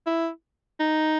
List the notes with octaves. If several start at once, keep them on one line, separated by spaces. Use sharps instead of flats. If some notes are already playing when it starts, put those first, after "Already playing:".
E4
D#4